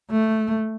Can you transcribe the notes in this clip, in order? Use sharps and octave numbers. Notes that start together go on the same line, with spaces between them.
A3